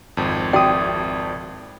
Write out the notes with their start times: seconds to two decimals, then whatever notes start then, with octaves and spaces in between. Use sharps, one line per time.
0.17 G#1 F2
0.53 F#4 D5 E5 G5 D#6